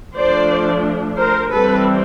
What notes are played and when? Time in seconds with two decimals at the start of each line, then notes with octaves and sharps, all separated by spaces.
0.16 F3 A3 D4 C5 D5
1.20 A#4 C5
1.55 E3 G3 C4 A4 B4